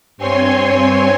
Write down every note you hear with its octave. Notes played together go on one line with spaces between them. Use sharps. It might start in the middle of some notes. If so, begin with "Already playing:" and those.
G2 C4 C#5 G#5 C6